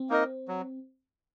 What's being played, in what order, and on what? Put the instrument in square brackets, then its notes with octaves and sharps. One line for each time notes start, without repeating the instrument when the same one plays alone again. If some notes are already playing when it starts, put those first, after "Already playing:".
Already playing: [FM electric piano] C4
[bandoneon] A#3 D#4 A#4 D#5
F#3